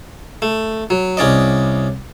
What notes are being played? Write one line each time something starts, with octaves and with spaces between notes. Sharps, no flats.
A3
F#3
C2 C#4 D5 D#5